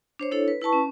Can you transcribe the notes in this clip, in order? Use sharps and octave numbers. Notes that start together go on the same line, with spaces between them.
D4 C5 C#5
D4 E4 A4 C#5
B4
E4 B4 A5 C#6
C#4